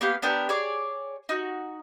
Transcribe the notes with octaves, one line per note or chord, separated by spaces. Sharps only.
A#3 B3 G4 F5
B3 D4 G4 A#4
G#4 C#5 D5
D#4 F#4